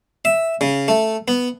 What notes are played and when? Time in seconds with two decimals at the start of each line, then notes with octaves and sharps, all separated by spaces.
0.25 E5
0.61 C#3
0.88 A3
1.28 B3